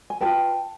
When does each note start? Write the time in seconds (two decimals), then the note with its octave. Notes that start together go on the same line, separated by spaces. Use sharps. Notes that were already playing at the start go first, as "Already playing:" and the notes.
0.10 G#5
0.21 F4 G#4 B4 G5 A5